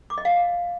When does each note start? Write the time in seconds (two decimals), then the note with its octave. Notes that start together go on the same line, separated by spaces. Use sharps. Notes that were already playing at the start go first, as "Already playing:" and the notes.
0.10 D6
0.18 D#5
0.25 F5